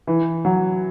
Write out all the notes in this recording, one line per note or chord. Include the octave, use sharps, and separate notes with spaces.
E3
F#3